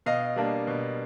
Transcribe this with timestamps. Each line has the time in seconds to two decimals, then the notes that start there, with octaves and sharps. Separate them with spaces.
0.06 B2 D#5 F5
0.36 G3 A#3 D4
0.67 B2